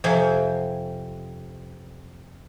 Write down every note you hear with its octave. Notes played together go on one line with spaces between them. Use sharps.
F2 C3 G5 G#5